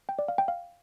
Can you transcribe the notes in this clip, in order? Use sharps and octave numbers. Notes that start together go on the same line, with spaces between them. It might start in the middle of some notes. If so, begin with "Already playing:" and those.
G5
D5
F5
G5
F5